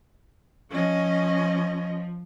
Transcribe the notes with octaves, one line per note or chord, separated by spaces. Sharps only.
F3 C#4 D#5